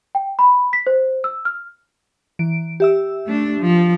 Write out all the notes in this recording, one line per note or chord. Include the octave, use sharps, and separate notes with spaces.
G5
B5
B6
C5
E6
F6
E3 D7
G4 E5 E6
A3 D4
F3